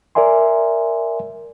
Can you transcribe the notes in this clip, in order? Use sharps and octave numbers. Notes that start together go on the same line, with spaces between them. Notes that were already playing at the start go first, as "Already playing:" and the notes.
A#4 D5 E5 G#5 C6